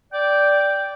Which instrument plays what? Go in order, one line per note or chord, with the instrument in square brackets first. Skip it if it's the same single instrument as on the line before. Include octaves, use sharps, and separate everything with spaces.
[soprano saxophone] D5 [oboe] G5